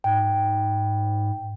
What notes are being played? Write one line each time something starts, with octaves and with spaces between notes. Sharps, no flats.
G#2 G5